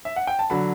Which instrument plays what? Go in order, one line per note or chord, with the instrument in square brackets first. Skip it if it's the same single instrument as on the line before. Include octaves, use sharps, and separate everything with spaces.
[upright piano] E5
F#5
G5
A5
[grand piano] D3 F#3 [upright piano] B5